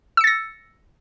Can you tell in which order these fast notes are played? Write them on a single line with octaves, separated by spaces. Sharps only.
E6 C#7 A6 A#6